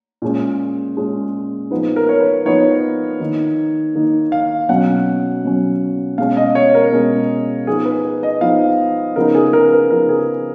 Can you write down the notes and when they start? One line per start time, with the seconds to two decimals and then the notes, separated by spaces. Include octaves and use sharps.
0.22 A#2 G#3 C#4
0.97 A#2 G#3 C#4
1.71 F3 B3 D#4 B4
1.96 A#4
2.09 C#5
2.20 B4
2.45 F3 B3 D#4 C#5
3.20 D#3 A#3 D#4
3.95 D#3 A#3 D#4
4.32 F5
4.69 B2 F#3 C#4 F#5
5.44 B2 F#3 C#4
6.18 B2 G#3 C#4 F5
6.37 D#5
6.55 C#5
6.74 A#4
6.93 B2 G#3 C#4
7.67 F3 B3 D#4 G#4
7.85 B4
8.05 B4
8.23 D#5
8.41 F3 B3 D#4 F5
9.16 C#3 F3 B3 D#4 A#4
9.35 G#4
9.53 A#4
9.72 B4
9.90 C#3 F3 B3 D#4 A#4
10.09 G#4